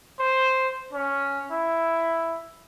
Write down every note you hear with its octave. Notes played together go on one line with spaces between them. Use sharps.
C5
C#4
E4